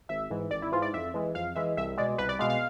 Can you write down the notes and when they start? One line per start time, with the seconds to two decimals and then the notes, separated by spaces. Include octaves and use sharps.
0.09 G#1 E5
0.30 G#2 E3
0.51 G#1 D5
0.62 E4
0.72 G#2 E3 F4
0.82 D5
0.94 F2 E5
1.14 E3 G#3
1.35 F2 F5
1.55 E3 G#3 E5
1.77 C2 E5
1.97 B2 G#3 D5
2.18 C2 B4
2.29 D5
2.39 B2 G#3 F5
2.50 F5